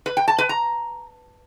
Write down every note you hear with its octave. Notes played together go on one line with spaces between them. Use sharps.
B4
G5
A5
B4
A#5